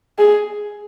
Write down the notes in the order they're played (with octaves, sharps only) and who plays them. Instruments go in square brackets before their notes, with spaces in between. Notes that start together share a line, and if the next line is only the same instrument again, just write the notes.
[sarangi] G#4